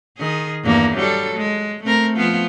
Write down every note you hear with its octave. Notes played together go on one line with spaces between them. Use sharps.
D#3 G#4
E2 G2 A#3
F#3 G3 A4
G#3
A3 C4 A#4
F3 B3 F4